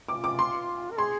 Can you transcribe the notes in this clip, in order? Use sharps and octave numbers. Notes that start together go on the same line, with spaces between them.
F4 D6
D6
C6
A#4
G#4 C6